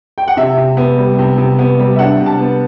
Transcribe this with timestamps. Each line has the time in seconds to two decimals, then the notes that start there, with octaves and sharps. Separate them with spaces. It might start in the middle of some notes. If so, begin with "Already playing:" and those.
0.18 G5
0.28 F#5
0.37 C3 E5
0.58 C3
0.77 B3
0.98 G3
1.19 C3
1.38 C3
1.59 B3
1.79 G3
1.96 E5
1.99 D4 F#5
2.20 C3
2.26 A5
2.39 B3